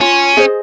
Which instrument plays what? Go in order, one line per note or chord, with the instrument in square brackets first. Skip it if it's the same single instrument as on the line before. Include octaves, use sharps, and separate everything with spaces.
[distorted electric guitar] C#4 [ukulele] F4
[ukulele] G#4 C5 D#5